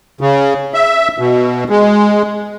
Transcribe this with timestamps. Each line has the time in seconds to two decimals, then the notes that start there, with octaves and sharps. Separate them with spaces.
0.21 C#3
0.74 E5
1.19 B2
1.69 G#3